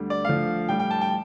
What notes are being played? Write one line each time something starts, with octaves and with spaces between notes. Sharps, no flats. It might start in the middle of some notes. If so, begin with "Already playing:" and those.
Already playing: D2 D3 G3
D5
D2 D3 F3 F5
A2 G3 G5
G5
A5
G5